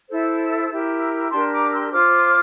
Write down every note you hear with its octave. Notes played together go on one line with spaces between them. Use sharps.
E4 A4 C5
E4 G4 A#4
D4 G4 A#4 A5 C6
A#5 D6
C6 E6
F4 C5 D6 F6